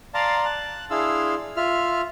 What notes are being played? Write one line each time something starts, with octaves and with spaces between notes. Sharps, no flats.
D5 F5 A5 A#5 C6
A5 F#6
D4 E4 G#4 F5 C6 E6
F4 E5 F6